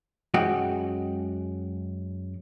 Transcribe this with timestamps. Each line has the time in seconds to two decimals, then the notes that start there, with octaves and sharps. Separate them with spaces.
0.34 F#2 G#3 F#4 G5